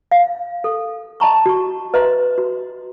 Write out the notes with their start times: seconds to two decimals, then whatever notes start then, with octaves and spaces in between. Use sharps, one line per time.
0.11 F5
0.64 A4
1.20 D#5 A5 A#5 C#6
1.46 F#4 C#6
1.94 B4 D#5 E5 A#5 C6
2.38 F#4